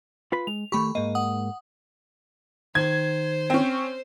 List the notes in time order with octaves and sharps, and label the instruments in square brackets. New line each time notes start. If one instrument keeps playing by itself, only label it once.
[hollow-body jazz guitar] F4 B4 B5
[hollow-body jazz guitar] G#3 [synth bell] F7
[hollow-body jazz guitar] D#3 A3 G4 [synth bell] B5 C#6
[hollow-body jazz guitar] G#2 A#3 [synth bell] D#5
[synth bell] F#5 D#6
[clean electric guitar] D#3 [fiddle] C5 [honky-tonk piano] G#6
[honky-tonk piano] C4 C#4